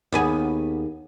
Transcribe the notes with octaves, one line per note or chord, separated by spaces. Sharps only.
D#2 B3 G#4